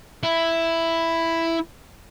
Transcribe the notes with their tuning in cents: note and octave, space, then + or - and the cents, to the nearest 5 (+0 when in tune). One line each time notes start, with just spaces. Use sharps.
E4 +5